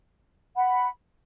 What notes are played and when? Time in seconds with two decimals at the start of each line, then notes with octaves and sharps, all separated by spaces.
0.56 F#5 B5